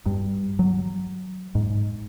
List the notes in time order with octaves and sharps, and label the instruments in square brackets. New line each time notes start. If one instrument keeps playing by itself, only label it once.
[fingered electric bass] G2
F#3
G#2